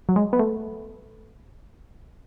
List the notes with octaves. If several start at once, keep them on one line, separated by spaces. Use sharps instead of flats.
F#3
G#3
B3
A3